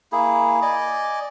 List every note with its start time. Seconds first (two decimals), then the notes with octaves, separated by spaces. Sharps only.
0.12 A#3 E4 G#4
0.62 D5 D#5 G#5 D6